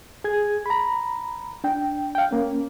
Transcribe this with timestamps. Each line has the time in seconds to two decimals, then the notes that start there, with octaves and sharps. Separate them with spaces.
0.24 G#4 G#6
0.66 A#5 B5
1.64 D4 G5
2.15 F5 G5
2.31 A#3 C#4